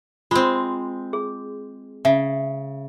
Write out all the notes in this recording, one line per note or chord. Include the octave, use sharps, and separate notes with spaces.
G#3 C4 F4
G#4
C#3 E5